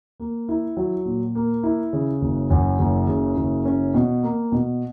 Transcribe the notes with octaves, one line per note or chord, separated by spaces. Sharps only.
A#3
E4
F#3
A#2
A#3
E4
C#3
F#1
F#2
F#1
C#3
F#1
C#4
B2
A#3
B2